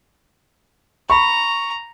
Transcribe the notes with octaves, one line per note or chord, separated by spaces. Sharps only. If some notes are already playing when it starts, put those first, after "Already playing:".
A#5 B5 C#6